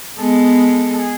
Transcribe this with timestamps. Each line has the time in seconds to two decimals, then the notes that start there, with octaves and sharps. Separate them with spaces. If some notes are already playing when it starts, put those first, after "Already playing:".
0.17 G#3 B3 A4
0.93 A4
0.97 G#4